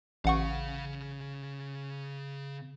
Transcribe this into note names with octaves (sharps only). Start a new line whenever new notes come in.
A1 C#3 F5 F#5 C#6